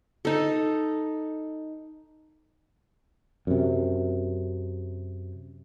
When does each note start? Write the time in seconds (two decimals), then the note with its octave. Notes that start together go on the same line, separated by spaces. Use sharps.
0.25 D#4 A4
3.47 F#2 C3